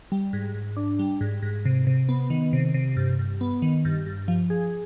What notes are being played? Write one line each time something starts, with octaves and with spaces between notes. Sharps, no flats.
G3
G#2
G#2
D4
G3
G#2
G#2
C3
C3
B3
D#3
C3
C3
G2
G2
B3
D#3
G2
G2
F3
G#4